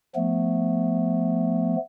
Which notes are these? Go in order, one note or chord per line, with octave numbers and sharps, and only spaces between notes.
F3 A3 B3